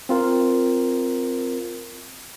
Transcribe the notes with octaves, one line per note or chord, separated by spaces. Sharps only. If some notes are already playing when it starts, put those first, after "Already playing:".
C4 F4 A#4